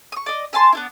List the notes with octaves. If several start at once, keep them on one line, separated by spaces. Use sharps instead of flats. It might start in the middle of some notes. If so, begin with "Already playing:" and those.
C#6 D#6
D5 D#5
E5 G#5 A5 C6
B3 D4 E4